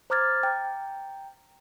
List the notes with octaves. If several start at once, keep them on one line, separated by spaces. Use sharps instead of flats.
C5 A#5 D6 F6 G#6 A6
G5 A#5